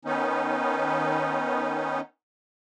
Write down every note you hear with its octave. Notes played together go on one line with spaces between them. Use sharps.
D#3 B3 C#4 D#4